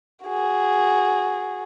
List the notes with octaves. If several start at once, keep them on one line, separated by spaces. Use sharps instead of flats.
F#4 G#4